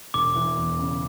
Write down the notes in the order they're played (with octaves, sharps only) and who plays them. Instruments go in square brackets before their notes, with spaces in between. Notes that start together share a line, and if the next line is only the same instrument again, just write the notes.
[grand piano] E1 [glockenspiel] D6
[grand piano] E3
E2
C#3